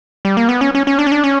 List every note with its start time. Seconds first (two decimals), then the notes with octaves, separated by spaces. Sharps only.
0.25 G3
0.37 A#3
0.49 B3
0.61 C#4
0.75 C#4
0.87 C#4
0.99 D4
1.07 C#4
1.12 D4
1.24 C#4